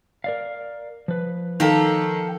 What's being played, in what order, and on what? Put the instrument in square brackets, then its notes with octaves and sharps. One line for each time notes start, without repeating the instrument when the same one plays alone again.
[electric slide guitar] A#4 D5 F5
F3 B4
[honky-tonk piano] D#3 [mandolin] A#3 G4 A4